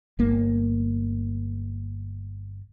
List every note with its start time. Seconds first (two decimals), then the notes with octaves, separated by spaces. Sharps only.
0.19 G1 A#3